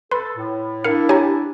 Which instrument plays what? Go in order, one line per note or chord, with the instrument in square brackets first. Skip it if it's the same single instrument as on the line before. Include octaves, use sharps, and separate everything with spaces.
[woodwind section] A4 [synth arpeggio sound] B4 [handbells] C6
[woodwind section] A2
[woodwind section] D4 E4 [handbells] A#4 C#7 [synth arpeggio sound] F5
[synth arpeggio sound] G4 G#5 [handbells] C#5 A#5